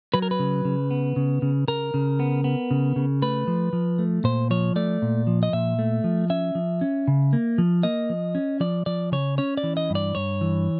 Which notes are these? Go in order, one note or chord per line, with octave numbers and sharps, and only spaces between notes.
F#3 B4
A#4
B4
C#3
C#3
B3
C#3
C#3
C#3 A#4
C#3
B3
B3
C#3
C#3
A3 B4
F3
F3
A3
A#2 C5
F3 C#5
A3 D5
A#2
F3
D#5
A#2 E5
A3
F3
C#4 E5
F3
C#4
C#3
A#3
F3
A#3 D#5
F3
C#4
F3 D5
F3 D5
C#3 C#5
C#4 C#5
D5
E3
D#5
G2
D5
G2 C#5
E3